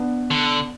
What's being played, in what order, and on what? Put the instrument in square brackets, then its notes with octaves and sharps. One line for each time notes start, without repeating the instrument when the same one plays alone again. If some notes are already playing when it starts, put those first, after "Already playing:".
Already playing: [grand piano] B3 D4
[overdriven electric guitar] D3